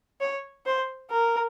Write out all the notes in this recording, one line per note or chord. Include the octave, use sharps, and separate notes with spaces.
C#5
C5
A#4